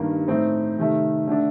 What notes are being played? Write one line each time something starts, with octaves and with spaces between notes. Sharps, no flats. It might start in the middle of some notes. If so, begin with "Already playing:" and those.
Already playing: G2 D#3 G3 A#3
A2 A3 C4 D#4
C3 D#3 A3
D3 A3 D4